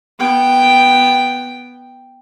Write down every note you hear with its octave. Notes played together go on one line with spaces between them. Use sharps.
B3 G5